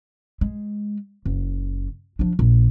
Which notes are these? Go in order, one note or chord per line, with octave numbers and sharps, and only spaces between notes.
G#3
F#1
F3 D4
A#1